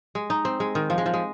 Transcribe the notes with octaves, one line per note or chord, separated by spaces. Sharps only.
G#3
D#4
C4
G#3
D#3
F3
G#3
F3
G#3